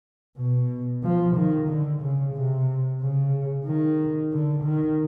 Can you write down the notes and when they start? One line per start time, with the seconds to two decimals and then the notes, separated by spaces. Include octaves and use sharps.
0.37 B2
1.03 F3
1.36 D#3
1.69 D3
2.02 C#3
2.34 C3
3.01 C#3
3.65 D#3
4.32 D3
4.64 D#3